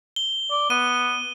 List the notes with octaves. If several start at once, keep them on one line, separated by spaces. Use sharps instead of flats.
G7
D5
B3 D#7